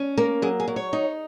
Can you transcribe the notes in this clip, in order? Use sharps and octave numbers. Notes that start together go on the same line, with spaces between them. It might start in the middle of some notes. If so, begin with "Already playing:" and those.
Already playing: C#4
A#3 A#4
F#3 G#4
G#4
F#3
C#5
D#4